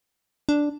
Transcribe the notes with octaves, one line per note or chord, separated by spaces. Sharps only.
D4